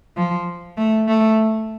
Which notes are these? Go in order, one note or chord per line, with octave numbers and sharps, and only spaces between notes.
F3
A3
A3